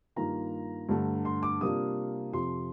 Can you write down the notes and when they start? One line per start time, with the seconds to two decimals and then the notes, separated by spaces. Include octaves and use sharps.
0.16 G2 D#3 A#3 F4 A#5
0.89 G2 D3 A3
1.25 C6
1.43 D6
1.61 C3 G3 A#3 D4 F4 D#6
2.33 F2 C3 F3 C6